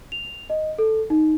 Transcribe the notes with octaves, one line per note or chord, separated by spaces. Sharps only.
F7
D#5
A4
D#4